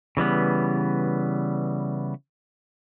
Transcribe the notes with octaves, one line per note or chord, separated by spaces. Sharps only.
C#3 E3 G3 B3